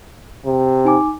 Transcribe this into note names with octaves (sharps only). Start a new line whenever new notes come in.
C3
D#4 G#5 D6